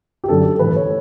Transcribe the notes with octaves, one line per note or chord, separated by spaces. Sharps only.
G4
F#2 D3 F#3 A4
A2 E3 B4
C#5